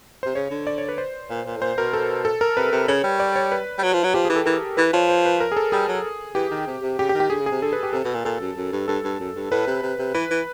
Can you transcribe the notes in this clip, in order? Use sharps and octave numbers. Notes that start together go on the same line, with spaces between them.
C3 C5
C#3 C#5
D3
D5
C#5
B4
C5
A#2
A#2
A2
A#2 C5
B2 A#4
A4
A4
A#4
C3 B4
C3
C#3 C#5
G3
D5
C#5
B4
G3
F#3
F3
F#3
F3 G4
G#4
E3
A4
E3 A#4
E3 B4
F3 C#5
C5
B4
A#4
G#4
A4
G3 G#4
F#3
E3 G4
D#3
C3
C3
C#3 G4
G4
D#3
G4
D3 G#4
C#3
G#4
C3
D3 A4
B4
G4
C3 A4
B2
A#2
A#2 A4
F#2
F#2
G2
G2 A4
G2
F#2
G2
A2 B4
C3
C3
C3
E3 B4
E3